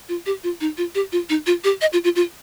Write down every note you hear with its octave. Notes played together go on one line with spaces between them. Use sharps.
F4
G4
F4
D#4
F4
G4
F4
D#4
F4
G4
D#5
F4
F4
F4